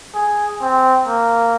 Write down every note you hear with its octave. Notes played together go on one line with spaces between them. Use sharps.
G#4
C4
A#3